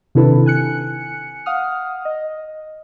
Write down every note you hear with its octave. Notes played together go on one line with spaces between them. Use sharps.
C3 D#3 D4 E4 A4 B4
G#5 F#6 C#7
F5 F#5 D#6 F6
D#5